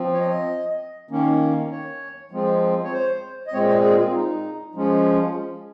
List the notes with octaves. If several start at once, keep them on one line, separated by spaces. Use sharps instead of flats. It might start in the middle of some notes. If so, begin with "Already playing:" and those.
Already playing: F3 C4
C#5
D#5
D#3 A#3 C#4
C#5
F3 G#3 C4
C#5
C5
D#5
A#2 G#3 C4 C#5
D#5
G#4
F4
D#4
F3 G#3 C#4